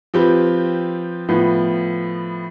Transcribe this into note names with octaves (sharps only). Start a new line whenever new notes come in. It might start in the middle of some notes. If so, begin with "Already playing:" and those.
F3 C4 G4 B4
A2 F3 B3